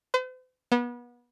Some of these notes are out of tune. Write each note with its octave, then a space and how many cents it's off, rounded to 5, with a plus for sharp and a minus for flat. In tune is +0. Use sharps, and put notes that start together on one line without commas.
C5 -45
B3 -30